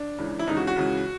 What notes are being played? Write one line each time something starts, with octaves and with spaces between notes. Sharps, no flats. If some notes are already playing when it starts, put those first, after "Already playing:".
Already playing: D4
C#2 C#3 E3
E4
C#2 C#3 E3 D#4
F#4
F#4
C#2 C#3 E3